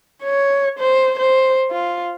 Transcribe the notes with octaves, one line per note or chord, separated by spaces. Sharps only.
C#5
C5
C5
F4